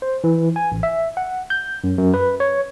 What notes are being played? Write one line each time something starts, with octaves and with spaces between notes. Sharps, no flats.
C5
E3
G#5
A1
E5
F#5
G6
F#2
F#2
B4
C#5